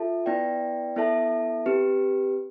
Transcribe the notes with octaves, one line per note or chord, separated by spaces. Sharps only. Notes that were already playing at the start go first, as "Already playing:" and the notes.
Already playing: F4 A4 E5 A5
B3 E4 B4 D5 G5
B3 E4 A4 E5 A5
C4 G4 B4